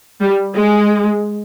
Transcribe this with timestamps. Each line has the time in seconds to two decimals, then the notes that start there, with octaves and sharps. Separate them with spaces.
0.20 G3
0.54 G#3